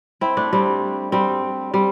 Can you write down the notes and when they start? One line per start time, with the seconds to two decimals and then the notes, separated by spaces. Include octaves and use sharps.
0.21 C4 E4
0.37 A3 D4
0.53 G3 C4
1.12 G3 C4
1.74 G3 C4